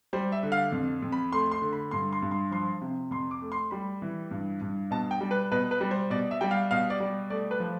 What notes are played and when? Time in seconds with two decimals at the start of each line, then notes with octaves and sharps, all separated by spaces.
0.13 G3 C5
0.32 E5
0.43 D3
0.52 F5
0.72 F2
1.03 F2
1.12 B5
1.32 A3 C6
1.51 C6
1.62 D3
1.73 B5
1.91 G2 C6
2.13 C6
2.22 G2
2.31 C6
2.51 F3 C6
2.81 C3
3.11 F2 C6
3.31 D6
3.42 A3
3.52 C6
3.71 G3 B5
4.02 E3
4.31 G2
4.61 G2
4.91 B2 A5
5.11 G5
5.21 G3
5.31 B4
5.52 B2 B4
5.71 B4
5.81 G3
5.91 C5
6.10 B2 D5
6.31 E5
6.41 G3 G5
6.51 F5
6.71 B2 F5
6.90 D5
7.00 G3
7.30 A3 D5
7.51 B4
7.60 F3